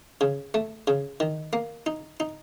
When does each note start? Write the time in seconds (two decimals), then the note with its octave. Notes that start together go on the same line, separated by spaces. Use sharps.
0.21 C#3
0.54 A3
0.87 C#3
1.20 D#3
1.53 A#3
1.86 D#4
2.20 D#4